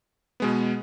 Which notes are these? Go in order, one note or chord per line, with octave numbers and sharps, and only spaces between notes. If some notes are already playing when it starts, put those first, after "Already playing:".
B2 G#3 B3